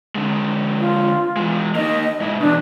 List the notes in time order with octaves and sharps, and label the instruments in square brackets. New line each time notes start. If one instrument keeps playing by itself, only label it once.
[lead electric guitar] D3 G#3
[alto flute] F4
[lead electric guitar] E3 G#3
[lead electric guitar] A#3 D#4 [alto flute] D#5
[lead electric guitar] G#2 E4
[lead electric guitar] B2 E3 [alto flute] D4